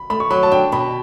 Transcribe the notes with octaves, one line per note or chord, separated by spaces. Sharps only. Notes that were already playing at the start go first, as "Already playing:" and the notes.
Already playing: B5
A3 B5
C#6
F#3 B5
A5
D4 G5
B2 B5